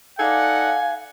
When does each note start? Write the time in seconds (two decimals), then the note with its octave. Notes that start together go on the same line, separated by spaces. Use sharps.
0.19 D#4 A4 D5 F5 F#5 G#5